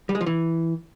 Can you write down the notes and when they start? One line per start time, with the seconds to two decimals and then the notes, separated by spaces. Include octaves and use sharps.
0.09 G3
0.15 G#3
0.21 F3
0.26 E3